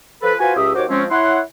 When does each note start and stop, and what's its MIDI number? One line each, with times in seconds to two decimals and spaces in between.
0.22 0.33 53
0.22 0.33 69
0.22 0.33 71
0.40 0.53 65
0.40 0.53 66
0.40 0.53 71
0.40 0.53 72
0.40 0.53 80
0.56 0.72 37
0.56 0.72 67
0.56 0.72 76
0.56 0.72 87
0.75 0.84 39
0.75 0.84 66
0.75 0.84 72
0.75 0.84 73
0.75 0.84 86
0.89 1.04 53
0.89 1.04 56
0.89 1.04 60
0.89 1.04 61
1.11 1.39 64
1.11 1.39 73
1.11 1.39 78
1.11 1.39 84